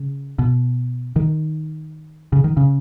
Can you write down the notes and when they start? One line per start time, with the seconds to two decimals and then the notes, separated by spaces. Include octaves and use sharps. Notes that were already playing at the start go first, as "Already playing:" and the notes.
Already playing: C#3
0.39 B2
1.16 D#3
2.33 C#3
2.44 D#3
2.57 C#3